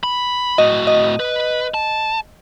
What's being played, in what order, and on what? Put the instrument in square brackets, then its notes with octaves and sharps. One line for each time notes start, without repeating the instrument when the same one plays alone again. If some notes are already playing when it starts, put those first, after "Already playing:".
[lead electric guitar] B5
[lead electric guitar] A2 F#4 [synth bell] D#5
[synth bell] D#5
[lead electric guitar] B4
A5